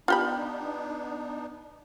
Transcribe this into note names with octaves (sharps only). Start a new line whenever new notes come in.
B3 D4 D#4 F4 G4 B5